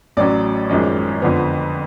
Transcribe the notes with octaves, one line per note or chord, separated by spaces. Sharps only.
A1 A2 F#3 C#4 D5
G#1 F#2 F3 G#3 C#4
F2 D3 F3 B3